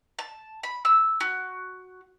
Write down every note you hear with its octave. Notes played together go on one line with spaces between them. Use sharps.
A5
B5
E6
F#4